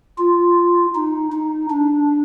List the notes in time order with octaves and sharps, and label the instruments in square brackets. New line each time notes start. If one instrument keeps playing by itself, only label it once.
[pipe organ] F4
D#4
D#4
D4